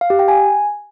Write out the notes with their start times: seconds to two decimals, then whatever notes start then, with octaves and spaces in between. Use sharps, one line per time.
0.01 F5
0.10 G4
0.19 G5
0.28 G#5